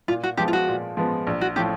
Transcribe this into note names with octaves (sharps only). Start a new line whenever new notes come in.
A#2 F4
F#4
F3 G#3 B3 G4
F4
F#4
A#2
F3 G#3 B3
A#1
F#4
A2 F3 G4